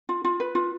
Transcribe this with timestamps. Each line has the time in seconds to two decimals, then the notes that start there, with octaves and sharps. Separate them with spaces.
0.09 F4
0.24 F4
0.40 B4
0.55 F4